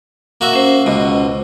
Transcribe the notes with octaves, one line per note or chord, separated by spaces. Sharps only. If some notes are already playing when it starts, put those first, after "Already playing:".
A#3 F#4 E5
C#4 C5
C#2 B2